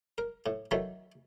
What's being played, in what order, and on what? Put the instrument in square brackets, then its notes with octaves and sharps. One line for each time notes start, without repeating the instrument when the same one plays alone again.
[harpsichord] A#4
A2
D#3 E3 F#3 A3